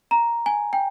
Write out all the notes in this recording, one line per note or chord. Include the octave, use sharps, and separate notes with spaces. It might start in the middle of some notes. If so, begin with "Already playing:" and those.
A#5
G#5
G5